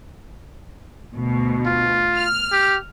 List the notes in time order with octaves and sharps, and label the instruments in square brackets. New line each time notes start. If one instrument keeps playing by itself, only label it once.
[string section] D2 B2
[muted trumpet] F4
[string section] F6
[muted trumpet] G4